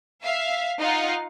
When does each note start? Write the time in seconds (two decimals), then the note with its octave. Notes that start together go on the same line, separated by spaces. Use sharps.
0.24 E5 F5
0.79 D#4 F4 F5 F#5